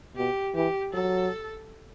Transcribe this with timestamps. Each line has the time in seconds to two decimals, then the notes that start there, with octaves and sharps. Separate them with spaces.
0.16 B2 G4
0.55 E3 G4
0.93 F#3 A4